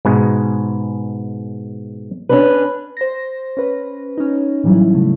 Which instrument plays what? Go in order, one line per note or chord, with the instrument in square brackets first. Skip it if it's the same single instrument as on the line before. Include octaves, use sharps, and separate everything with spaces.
[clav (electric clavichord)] G#2 B2 G#3
[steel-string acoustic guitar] C#4 D4 B4
[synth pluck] C5 A#6
C#4 B4
C#4 D#4
A2 E3 F#3 G3 E4
C#3 A3